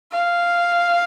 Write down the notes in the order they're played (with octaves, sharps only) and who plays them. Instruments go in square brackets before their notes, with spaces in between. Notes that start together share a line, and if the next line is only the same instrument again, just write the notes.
[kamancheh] F5